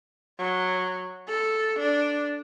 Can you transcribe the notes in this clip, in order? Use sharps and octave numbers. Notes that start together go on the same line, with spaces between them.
F#3
A4
D4